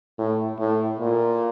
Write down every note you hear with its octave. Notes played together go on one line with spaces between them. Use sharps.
A2
A2
A#2